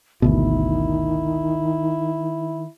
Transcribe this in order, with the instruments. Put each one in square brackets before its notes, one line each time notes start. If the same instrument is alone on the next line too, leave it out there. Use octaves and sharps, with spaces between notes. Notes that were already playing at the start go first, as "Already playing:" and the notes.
[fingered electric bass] G#1 D2 B2 [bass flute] D#3 [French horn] E4